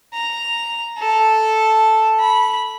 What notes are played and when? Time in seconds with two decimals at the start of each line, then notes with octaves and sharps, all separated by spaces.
0.13 A#5
0.99 A4
2.20 B5